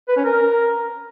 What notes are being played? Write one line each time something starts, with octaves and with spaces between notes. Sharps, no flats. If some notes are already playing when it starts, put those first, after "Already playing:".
B4
C#4
A#4